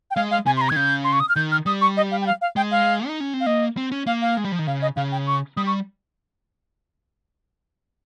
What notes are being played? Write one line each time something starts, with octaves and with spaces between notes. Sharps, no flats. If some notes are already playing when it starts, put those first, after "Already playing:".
G5
G#3 F5
F5
C3 G#5
C6
A#5
D#3 G#6
C#3 G6
C6
C#6
D#6
F6
D#3 G6
F6
G3 D#6
C#6
D#5
F5
G5
F5
F5
G#3 G5
F5
D#4
C#4
C4
F5
A#3 D#5
C4
C#4
A#3 F5
F5
G#3
G3
F3
D#3
C#3 F5
D#5
C#3 F5
G5
C#6
G3 D#6
C#6